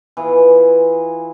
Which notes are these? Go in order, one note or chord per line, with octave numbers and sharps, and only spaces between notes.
E3 F4 G#4